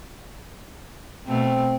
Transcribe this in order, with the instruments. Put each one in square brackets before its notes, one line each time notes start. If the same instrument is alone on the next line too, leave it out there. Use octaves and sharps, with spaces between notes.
[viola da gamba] B2 A3 [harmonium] C4